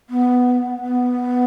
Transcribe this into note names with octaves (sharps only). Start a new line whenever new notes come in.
B3
B3